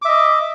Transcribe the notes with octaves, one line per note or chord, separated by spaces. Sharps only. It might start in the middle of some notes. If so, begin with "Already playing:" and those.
D#5 E5 D6